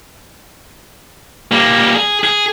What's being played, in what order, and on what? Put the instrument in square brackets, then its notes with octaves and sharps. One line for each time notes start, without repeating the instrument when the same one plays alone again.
[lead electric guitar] G3 A#3
G#4
G#4